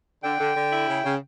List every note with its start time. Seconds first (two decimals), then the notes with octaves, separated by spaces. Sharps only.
0.23 D3 G5
0.39 D3
0.56 D3
0.71 E4
0.88 C#3
1.04 C#3